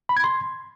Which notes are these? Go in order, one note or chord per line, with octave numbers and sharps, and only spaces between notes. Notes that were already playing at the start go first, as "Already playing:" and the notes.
B5
G#6
C6